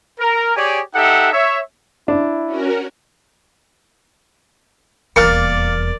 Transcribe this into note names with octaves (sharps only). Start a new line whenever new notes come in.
A#4
G4 G#4 C#5 D5 G5 G#5
D#4 G4 A4 E5 F#5
C#5 E5
D4 E4
C#4 F#4 A#4
D#1 E2 A#3 A#4 D5 F6 A6 C#7